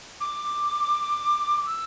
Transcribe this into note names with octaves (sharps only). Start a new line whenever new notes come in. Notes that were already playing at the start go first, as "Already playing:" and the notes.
D6
D6
E6